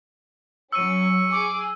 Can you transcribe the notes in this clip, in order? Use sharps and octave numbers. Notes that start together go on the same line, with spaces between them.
F#3 C#4 C#6 E6 D#7
G#4 D6